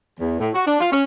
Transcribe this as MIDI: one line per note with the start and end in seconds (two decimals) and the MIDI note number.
0.20 0.39 40
0.40 0.49 45
0.54 0.62 66
0.66 0.79 62
0.80 0.90 65
0.92 1.03 61